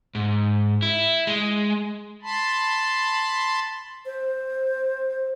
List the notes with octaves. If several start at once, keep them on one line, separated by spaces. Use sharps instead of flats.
G#2
E4
G#3
A5 B5 C6
C5